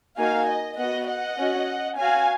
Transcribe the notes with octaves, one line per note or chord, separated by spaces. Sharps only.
A#3 D#4 F#4 F5 G#5
D#5
B3 F#4 D#5 F#5
D#5 F#5
C#4 F#4
C#4 F#4 F5 G#5